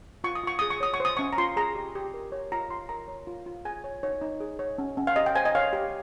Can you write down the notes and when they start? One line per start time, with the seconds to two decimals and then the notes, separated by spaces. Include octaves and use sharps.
0.24 F4 C#6
0.35 D#6
0.44 F4 C#6
0.59 G#4 D#6
0.70 C#6
0.80 C#5 D#6
0.94 C#6
1.00 C5 D#6
1.17 C#4 C#6
1.33 A#5
1.38 F4 C6
1.57 G#4 A#5
1.75 G4
1.95 G4
2.14 A#4
2.32 C#5
2.52 F4 A#5
2.70 F4 C6
2.89 A#4 A#5
3.08 C#5
3.27 F4
3.46 F4
3.65 G#4 G#5
3.84 C#5
4.03 D#4 C#5
4.22 D#4
4.40 G#4
4.59 C#5
4.78 C#4
4.97 C#4
5.07 F5
5.16 G4 D#5
5.26 G5
5.35 C5 G#5
5.45 D#5
5.55 C#5 F5
5.73 G4